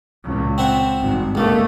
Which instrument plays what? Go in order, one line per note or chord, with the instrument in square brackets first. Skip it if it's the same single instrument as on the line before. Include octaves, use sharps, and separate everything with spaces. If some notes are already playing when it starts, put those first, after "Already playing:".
[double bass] C#2 A#2
[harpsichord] C4 E5 F#5
[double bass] G#1 G2
[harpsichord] C#2 A#3 [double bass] D3 A3